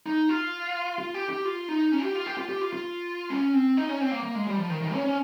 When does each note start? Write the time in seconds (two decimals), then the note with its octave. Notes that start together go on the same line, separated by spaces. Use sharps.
0.06 D#4
0.29 F4
0.98 F4
1.14 G4
1.30 G4
1.45 F4
1.68 D#4
1.92 C#4
2.03 G4
2.15 F4
2.26 G4
2.38 F4
2.49 G4
2.61 F4
2.73 F4
3.30 C#4
3.54 C4
3.77 D#4
3.89 C#4
4.01 C4
4.11 A#3
4.23 A#3
4.35 G#3
4.47 G3
4.58 F3
4.70 D#3
4.82 D#3
4.93 C#4
5.05 C#4